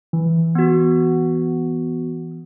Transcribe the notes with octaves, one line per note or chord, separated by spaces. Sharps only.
E3
B3 F#4